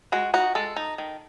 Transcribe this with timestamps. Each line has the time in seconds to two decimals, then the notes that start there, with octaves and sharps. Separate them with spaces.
0.12 G#3 F#4
0.34 D#4 F#4
0.55 G#3 A4
0.76 D#4
0.98 D#3